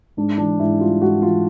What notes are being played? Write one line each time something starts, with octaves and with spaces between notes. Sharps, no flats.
G#2 D4
E3 D4
G#2 E4
G3 F4
G#2 F#4
E3 F4